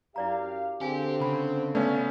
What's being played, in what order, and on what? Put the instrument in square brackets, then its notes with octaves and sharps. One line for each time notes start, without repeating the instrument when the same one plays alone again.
[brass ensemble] F#2 G4 F5 [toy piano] E4 D5 A#5
[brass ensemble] D3 C4 [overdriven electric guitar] G4 [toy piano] G#4 F5 G#5
[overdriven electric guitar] C#3 [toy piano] B5
[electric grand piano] A3 B3 C#4 [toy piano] D5 F5